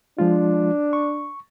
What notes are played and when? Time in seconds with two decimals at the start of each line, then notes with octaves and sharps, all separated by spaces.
0.18 F3 G#3 D4 F4
0.93 C#6